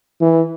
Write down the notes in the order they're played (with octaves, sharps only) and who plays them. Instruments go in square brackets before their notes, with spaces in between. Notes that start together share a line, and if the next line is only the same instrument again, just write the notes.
[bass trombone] E3